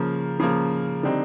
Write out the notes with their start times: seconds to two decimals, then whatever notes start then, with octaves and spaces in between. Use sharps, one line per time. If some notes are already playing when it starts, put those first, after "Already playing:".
Already playing: C#3 F3 A#3
0.40 C#3 F3 A#3
1.03 D3 G3 C4 D#4